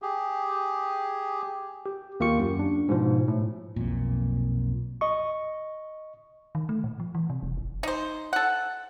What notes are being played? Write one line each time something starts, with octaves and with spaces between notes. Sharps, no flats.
G4 G#4
G4
D#2 A#3 F4 G4 C#6 C#7
F#2
D4
G#2 B2 F3
A2
B1 F2 A#2
D#5 C#6
D#3
A3
A#2
F3
E3
C3
E1
G#1
D#4 C5
A4 F#5